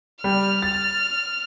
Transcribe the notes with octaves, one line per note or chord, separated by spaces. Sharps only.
G3 F6
A6